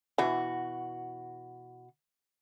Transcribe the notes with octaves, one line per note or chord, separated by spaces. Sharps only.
B2 E3 F#4